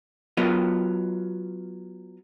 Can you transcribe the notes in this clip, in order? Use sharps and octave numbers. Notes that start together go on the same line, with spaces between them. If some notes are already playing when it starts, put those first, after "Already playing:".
F#3 B3 F4 A#4 D#5